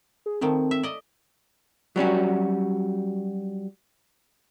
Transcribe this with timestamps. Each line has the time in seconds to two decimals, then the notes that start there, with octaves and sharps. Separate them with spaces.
0.26 G#4
0.41 D#3 F3 A3 C4
0.71 E5
0.83 D5 D#5
1.96 F#3 G3 C#4 F#4